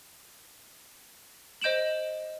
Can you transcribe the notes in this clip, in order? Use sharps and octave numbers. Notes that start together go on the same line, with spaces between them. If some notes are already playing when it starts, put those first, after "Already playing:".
C5 D#5 G6 D7 E7 F#7